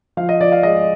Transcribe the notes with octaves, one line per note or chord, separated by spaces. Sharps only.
F3 F5
D#5
F3 D5
F5
G#3 D#5